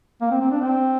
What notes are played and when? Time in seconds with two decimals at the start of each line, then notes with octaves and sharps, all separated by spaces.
0.21 A#3
0.31 C4
0.41 C4
0.51 D4
0.61 C4